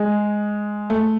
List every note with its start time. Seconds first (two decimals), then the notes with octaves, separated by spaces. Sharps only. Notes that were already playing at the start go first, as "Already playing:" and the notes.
Already playing: G#3
0.90 A3